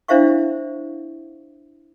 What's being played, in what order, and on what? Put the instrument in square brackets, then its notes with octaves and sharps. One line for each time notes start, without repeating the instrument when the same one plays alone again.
[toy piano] D4 E4 C5 E5 F5 C#6